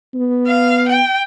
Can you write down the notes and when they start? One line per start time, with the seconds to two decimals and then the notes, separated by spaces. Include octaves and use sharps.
0.14 B3
0.47 F5
0.88 G5